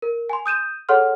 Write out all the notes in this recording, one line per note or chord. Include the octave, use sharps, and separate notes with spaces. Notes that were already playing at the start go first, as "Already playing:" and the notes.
A#4
G#5 C6
D#6 G6 D#7 E7
G#4 A4 C#5 F#5 C6 F6